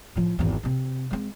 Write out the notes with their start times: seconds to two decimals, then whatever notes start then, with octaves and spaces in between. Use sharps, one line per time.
0.16 A2 F3
0.39 G#1 E2
0.63 C3 C4
1.11 G#3 C4